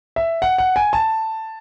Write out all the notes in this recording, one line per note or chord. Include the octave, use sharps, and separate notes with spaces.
E5
F#5
F#5
G#5
A5